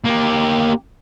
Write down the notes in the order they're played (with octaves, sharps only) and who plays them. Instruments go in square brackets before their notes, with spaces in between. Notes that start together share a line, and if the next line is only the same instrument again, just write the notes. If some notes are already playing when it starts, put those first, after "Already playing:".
[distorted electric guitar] A#3 G4